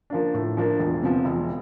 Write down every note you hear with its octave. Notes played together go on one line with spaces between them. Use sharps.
F3 A#3 D4
A2
F3 A#3 D4
E1
E2 C3 F3
E1